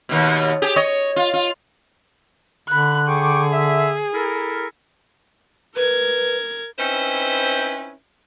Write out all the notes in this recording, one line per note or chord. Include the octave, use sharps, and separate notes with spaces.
D#2 B2
G4 G#4
C#5 D#5
F4
F4
D3 B5 F#6
G#4 G5 C#6 D6
E5
E4 A4 A#4
A#4 B4 G#6
C4 C#4 D#4 E4 B4 C5